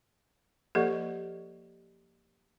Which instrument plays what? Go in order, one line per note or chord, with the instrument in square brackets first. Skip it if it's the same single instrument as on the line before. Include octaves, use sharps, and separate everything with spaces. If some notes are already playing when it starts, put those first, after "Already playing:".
[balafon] F3 A#3 A4 [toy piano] G4 D5 D#5